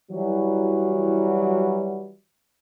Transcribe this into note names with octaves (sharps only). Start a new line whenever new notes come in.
E3 F#3 G3